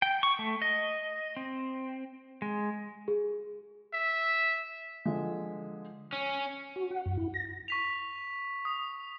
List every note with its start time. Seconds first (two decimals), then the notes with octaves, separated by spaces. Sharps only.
0.02 G5
0.23 C#6
0.39 A3
0.62 D#5
1.37 C4
2.42 G#3
3.08 G#4
3.94 E5
5.06 D3 F3 G#3
6.13 C#4
6.76 F#4
6.91 F#5
7.06 F#2
7.18 E4
7.34 A#6
7.68 C#6 B6 F7
8.65 D#6